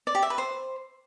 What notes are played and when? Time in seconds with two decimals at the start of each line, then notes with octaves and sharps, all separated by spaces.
0.07 D5
0.15 G4
0.22 E5
0.30 B4
0.38 C5